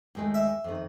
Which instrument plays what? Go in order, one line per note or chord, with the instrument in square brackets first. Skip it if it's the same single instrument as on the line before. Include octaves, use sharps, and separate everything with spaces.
[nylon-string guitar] D#2 G#3 A3
[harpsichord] E5
[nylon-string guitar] F2 D#3